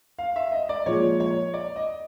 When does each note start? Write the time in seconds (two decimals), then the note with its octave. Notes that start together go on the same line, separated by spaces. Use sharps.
0.19 F5
0.36 E5
0.52 D#5
0.69 D5
0.86 A#2 F3 G#3 C#5
1.20 C#5
1.54 D5
1.76 D#5